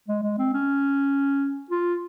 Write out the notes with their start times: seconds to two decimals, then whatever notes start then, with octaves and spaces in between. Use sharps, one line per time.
0.09 G#3
0.23 G#3
0.39 C4
0.54 C#4
1.71 F4